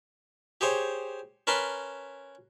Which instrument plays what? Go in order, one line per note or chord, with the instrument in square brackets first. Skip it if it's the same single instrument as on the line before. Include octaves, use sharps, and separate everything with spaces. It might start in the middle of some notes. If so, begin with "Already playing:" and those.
[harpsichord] G4 G#4 C5 C#5
C#4 A#4 B4 A5 B5 C6